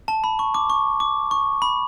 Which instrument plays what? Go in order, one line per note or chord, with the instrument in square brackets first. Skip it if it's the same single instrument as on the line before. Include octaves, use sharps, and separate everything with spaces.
[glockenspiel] A5
B5
C#6
D6
C#6
D6
C#6
B5